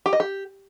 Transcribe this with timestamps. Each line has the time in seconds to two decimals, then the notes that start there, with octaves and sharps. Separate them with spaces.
0.06 G4
0.13 D#5
0.20 G4